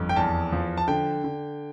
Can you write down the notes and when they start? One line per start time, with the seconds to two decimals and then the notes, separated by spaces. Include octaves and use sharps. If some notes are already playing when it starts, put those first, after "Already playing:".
Already playing: G1 F2
0.09 G5
0.16 E2 A5
0.52 F3
0.77 A5
0.88 D3 G5
1.24 D3